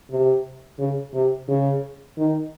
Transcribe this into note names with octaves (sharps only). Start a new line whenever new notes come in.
C3
C#3
C3
C#3
D#3